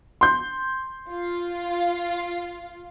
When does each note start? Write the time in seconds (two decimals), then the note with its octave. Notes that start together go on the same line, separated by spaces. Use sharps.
0.21 C6 G6
1.10 F4